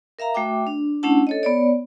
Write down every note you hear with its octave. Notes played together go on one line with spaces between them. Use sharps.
A#4 E5 F5 A#5
A3 F#4 E5 G5 D6
D4
A3 C#4 D4 E4 F#5 A5
A4 C#5 D#5
B3 C#5 D5